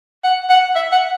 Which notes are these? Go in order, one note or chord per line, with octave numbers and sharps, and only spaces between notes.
F#5
F#5
E5
F#5